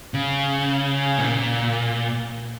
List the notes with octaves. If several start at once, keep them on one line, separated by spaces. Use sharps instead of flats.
C#3
A#2